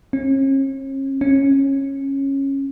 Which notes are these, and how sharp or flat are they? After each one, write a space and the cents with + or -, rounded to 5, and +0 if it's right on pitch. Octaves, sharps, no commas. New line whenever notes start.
C#4 -40
C#4 -15